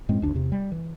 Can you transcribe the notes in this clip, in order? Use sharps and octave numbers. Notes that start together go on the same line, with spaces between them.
F#2 A2 G#3 C4
F#1 D2 D4
E2 C3
G3
E3